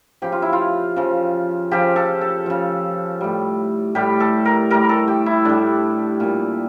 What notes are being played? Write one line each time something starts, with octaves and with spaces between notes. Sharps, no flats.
C#3 F3 G4
F4
E4
F4
C#3 F3
C#3 F3 G4
A4
A4
C#3 F3
A2 G3
A2 G3 G4
A4
A#4
A2 G3 A#4
A4
G4
E4
A2 G3 D4
A#2 G3